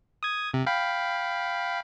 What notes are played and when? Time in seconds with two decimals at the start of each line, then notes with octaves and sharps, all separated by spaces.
0.23 D#6 G#6
0.54 C3
0.67 F5 G5 B5